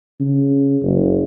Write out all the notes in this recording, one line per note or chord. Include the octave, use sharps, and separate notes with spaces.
C#3
F#1